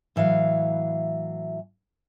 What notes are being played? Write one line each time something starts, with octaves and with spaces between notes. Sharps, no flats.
A2 E3 F#3 F5